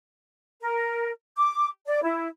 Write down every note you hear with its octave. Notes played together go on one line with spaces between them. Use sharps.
A#4
D6
D5
E4